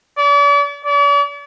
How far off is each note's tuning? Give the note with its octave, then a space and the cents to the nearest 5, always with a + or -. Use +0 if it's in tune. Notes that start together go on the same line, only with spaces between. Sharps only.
D5 -40
D5 -45